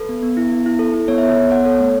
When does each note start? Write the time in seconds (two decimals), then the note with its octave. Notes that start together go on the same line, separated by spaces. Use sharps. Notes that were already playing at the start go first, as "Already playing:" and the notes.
Already playing: A4 B4
0.09 B3
0.23 B3
0.37 E4
0.52 B3
0.66 E4
0.79 A4
0.94 E4
1.08 B3 C#5
1.18 E5
1.23 A4 C#5
1.37 B3
1.51 B3 C#5 F#5
1.65 A4 C#5
1.80 A3